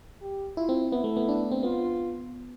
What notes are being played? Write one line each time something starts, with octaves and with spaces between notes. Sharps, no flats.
G4
E4 F4
C4
B3 E4
A3
B3
D4
C4
B3 F4